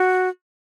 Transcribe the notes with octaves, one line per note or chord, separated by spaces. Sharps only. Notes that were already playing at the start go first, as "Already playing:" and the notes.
Already playing: F#4